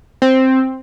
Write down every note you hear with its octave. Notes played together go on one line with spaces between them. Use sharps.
C4